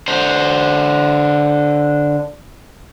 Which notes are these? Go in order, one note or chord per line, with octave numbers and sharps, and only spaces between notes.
D3 C5